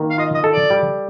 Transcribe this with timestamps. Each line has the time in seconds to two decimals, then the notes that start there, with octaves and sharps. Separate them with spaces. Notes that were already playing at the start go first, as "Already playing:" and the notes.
Already playing: D#3 A#3
0.10 F5
0.18 F4 D#5
0.35 D#5
0.44 A4
0.52 D5
0.70 G3